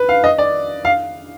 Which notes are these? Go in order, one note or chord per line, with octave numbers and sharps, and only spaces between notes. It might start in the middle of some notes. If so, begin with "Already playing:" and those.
Already playing: B4
F5
D#5
D5
F5